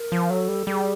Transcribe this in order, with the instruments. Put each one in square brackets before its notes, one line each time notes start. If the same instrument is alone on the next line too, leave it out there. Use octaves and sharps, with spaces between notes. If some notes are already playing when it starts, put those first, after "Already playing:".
Already playing: [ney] A#4
[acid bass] F3
[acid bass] F#3 [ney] A4
[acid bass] G3
[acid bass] G3 [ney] A4
[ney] G#4